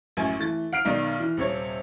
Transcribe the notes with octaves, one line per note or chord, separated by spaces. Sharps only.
A1 F#2 G#5
E3 A3 A6
F#5 F6 C7 D7
B1 B2 D#3 D#4 D5 A#5
E3
D#1 C3 C#5